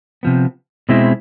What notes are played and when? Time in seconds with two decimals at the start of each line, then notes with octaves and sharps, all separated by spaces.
0.23 C3 F3 B3
0.89 B2 G#3 C4 E4